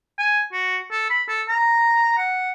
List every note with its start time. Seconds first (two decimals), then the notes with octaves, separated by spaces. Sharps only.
0.18 G#5
0.53 F#4
0.91 A4
1.10 B5
1.28 A4
1.48 A#5
2.18 F#5